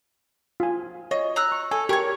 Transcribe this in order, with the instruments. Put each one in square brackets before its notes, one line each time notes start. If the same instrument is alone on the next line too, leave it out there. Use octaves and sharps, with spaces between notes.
[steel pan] F4 G#5
[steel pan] C#5 [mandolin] D#5
[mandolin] A#5 E6 F#6
[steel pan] C#6
[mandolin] A4 [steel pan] G#5
[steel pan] G4 G#5 C#6 [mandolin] A#4 C#5